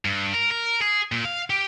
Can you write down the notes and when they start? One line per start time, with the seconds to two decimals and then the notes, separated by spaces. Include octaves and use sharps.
0.05 G2
0.33 A#4
0.51 A#4
0.82 G#4
1.12 A#2
1.25 F5
1.50 G4